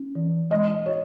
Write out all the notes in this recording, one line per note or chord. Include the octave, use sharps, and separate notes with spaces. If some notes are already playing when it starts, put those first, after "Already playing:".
Already playing: C#4
E3
G#3 D#5
F#4 C#5